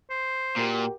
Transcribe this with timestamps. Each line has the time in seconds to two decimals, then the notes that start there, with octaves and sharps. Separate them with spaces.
0.10 C5
0.57 A#2 F#4 G4 A#4